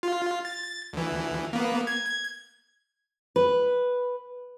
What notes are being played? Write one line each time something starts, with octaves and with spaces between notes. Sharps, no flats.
F4
A6
D2 E3
A#3 B3
G#6
B4